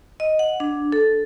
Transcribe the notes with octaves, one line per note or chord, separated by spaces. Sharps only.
D#5
F#5
D4
A4